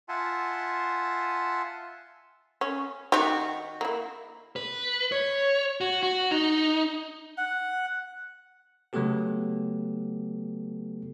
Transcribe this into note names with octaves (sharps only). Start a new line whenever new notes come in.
F4 E5 F#5 G#5 A5 C6
C#4
D#3 F#4 G4
A#3 E4
B4
C#5
F#4
F#4
D#4
F#5
C#3 F#3 A3 B3 G4 A4